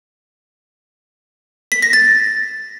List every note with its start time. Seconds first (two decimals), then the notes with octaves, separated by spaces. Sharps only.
1.72 B6
1.82 A#6
1.93 A6